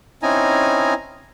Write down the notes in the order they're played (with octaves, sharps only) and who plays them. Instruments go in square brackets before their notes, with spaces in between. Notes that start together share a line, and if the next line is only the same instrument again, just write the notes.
[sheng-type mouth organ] C4 C#4 D#4 E4 G#5 A#5